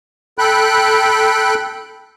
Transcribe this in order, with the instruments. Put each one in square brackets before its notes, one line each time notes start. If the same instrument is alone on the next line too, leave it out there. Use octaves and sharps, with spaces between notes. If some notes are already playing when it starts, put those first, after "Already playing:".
[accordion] A4 G5 B5 F#6